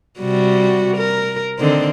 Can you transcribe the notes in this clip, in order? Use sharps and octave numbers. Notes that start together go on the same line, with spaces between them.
C3 G3 F#4
A#4
D3 D#3 C4